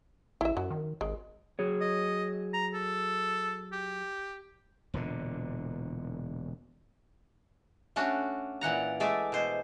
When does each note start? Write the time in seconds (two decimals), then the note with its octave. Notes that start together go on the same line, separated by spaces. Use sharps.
0.41 A1 E4 E5
0.57 F#2 F#3
0.70 D#3
1.01 G#1 G#3
1.59 F#3 G#4 C#5
1.81 D#5
2.53 A#5
2.74 A4
3.73 G4
4.94 E1 A#2 D3
7.96 A3 C#4 D4 F#4
8.61 A#2 E3 F#5 A#5
9.00 G#3 A3 D5 E5
9.32 B2 C5